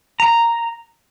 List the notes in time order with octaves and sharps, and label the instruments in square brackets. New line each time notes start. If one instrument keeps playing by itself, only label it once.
[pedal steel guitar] A#5